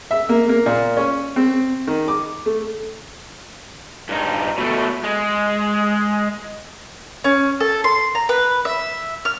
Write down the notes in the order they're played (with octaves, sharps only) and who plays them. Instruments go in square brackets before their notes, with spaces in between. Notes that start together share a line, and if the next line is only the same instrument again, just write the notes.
[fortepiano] E5
A#3
A#3
A#2
C#4
C4
D#3
D6
A3
[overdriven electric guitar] G2 D#4
B2 A3
G#3
[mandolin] C#4
A4
C6
A#5
B4
E5
F6